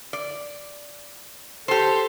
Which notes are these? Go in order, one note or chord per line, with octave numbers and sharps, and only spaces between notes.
D5
G4 A4 C5